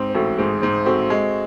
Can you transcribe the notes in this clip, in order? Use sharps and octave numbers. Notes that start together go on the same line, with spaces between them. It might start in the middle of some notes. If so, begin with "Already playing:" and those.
Already playing: G#2 C4
C5
A1 F#4 A4
G#2 G#4 C5
G#2 G#4 C5
C4 F#4 A4
G#3